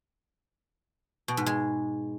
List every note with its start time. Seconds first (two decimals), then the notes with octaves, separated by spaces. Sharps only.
1.28 B2
1.37 G#2
1.46 G#3